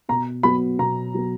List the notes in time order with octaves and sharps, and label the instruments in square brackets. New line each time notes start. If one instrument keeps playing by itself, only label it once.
[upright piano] B2 [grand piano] A#5
[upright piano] F#3 B3 [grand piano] B5
[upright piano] B2 [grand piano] A#5
[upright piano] F#3 B3